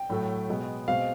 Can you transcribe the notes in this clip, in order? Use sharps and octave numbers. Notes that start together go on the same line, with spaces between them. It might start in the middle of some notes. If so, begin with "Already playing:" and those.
Already playing: G5
A2 F#3 A3
B2 G#3 B3
B2 G#3 C4 F5